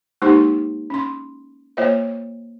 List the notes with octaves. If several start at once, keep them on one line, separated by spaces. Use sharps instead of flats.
G#3 A#3 D#4 G4 C5 C6
C#4 C6
A#3 F4 C5 C#5 D#5 E5